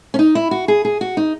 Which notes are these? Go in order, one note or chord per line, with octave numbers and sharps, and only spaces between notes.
C#4
D#4
E4
F#4
G#4
G#4
F#4
D#4